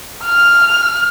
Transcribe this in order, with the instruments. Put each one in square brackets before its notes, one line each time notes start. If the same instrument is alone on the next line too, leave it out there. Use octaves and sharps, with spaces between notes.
[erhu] F6